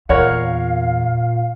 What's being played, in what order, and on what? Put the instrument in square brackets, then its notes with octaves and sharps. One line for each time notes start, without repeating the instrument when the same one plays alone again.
[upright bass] E2 [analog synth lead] A#2 [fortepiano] A#4 C#5 F#5 [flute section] F5